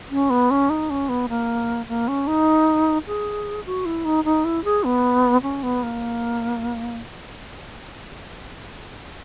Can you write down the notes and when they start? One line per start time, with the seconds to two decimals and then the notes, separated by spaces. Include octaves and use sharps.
0.10 C#4
0.30 B3
0.51 C#4
0.70 D#4
0.90 C#4
1.09 B3
1.29 A#3
1.88 A#3
2.08 C#4
2.27 D#4
3.07 G#4
3.66 F#4
3.85 E4
4.05 D#4
4.24 D#4
4.45 E4
4.64 G#4
4.84 B3
5.43 C#4
5.63 B3
5.83 A#3